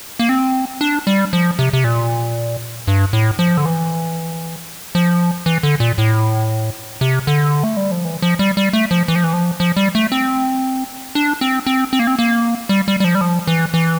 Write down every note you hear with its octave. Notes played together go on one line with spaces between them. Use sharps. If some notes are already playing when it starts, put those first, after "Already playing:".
A#3
C4
D4
G3
F3
C3
C3
A#2
G2
A2
F3
D3
E3
F3
E3
D3
A#2
A2
C3
D3
A3
G3
F3
E3
F3
G3
G3
A3
F3
E3
F3
E3
F3
F3
G3
A3
C4
D4
C4
C4
C4
A#3
C4
A#3
G3
G3
G3
F3
G3
F3
E3
E3